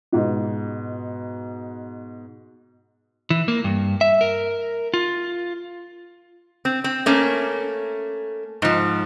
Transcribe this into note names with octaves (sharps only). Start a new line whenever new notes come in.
G#2 B2
E3
A#3
G2
E5
A#4
F4
C4
C4
A3 A#3 C#4
G#2 F3